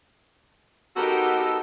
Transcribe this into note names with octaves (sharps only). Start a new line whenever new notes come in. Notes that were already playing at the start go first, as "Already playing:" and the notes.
B3 D#4 F#4 G4 A4 A#4 E6